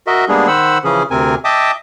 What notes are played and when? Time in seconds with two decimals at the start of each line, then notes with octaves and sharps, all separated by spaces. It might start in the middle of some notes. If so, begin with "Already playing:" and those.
0.07 F#4 A#4 D#5 E5
0.29 G3 G#3 A#3 B3 D4 G#4
0.47 D#3 C5 F#5 B5 E6
0.84 C#3 E3 F3 C#4 G#4
1.11 D2 C3 C4 A#4 G#5
1.45 D#5 E5 G5 A5 D6 D#6